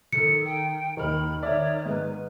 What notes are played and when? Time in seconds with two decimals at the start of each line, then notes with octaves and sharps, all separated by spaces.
0.13 D#3 A4 C#7
0.44 G5
0.97 D#2 D#3 B5 F6
1.43 D#3 C#5 D5 E5
1.86 G#2 B4